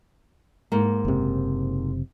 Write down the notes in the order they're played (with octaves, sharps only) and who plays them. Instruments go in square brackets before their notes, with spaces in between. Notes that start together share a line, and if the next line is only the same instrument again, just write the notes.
[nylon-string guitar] G#2 A#3
[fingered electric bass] F#1 C3